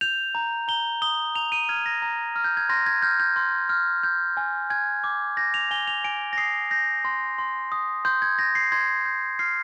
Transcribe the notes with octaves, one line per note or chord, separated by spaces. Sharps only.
G6 F7
A#5
A#5 G7
D#6 G7
A#5 F7
D#7
F6 G#6
A#6
A#5
F6
G6
G#6
C6 A#6
G#6
F6 G6
G6
C6
F6
G6
G#5
G#5 G#6
D6
G6 A#6
F7
G#5 G7
F7
G#5 D7
A#6
D#6 C7
G6 A#6
C6
C6
D#6
C6 G6
G#6
G6 A#6
C7
C6 G#6
G6
F6 C7